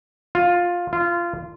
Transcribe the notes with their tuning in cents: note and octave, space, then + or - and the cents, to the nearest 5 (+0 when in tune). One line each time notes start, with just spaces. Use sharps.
F4 +10
F4 -20